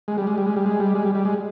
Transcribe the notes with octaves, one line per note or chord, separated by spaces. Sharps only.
G#3
G3
G#3
G3
G#3
G3
G#3
G3
G#3
G3
G3
G#3